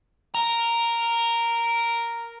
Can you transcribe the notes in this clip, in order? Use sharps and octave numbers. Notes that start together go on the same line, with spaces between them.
A#4 A#5